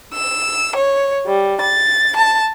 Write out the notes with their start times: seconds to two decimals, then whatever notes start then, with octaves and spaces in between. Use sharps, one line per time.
0.14 E6
0.76 C#5
1.27 G3
1.60 A6
2.16 A5